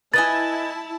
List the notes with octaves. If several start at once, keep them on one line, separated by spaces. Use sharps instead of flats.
E4 B4 D#5 G#5 A5 A6